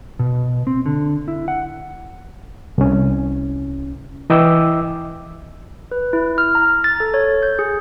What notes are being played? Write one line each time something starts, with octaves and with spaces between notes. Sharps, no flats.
B2
C4
D3
E4
F#5
C2 C#4
E3 D#5 G5 D6 E6
B4
E4
F6
A#5
A6
A4
C#5
G6
G#4